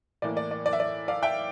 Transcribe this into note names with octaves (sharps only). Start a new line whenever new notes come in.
A2 E3 A#3 D5
D5
D5
D5
E5
D5
D5 F5
E5 G5